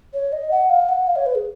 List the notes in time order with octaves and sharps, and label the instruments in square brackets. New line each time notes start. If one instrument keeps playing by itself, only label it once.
[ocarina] C#5
D#5
F#5
F5
F#5
F5
C#5
B4
G#4